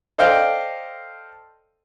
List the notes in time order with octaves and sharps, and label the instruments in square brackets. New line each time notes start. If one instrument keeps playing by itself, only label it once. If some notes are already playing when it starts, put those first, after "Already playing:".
[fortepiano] A4 C5 D5 D#5 F5 G5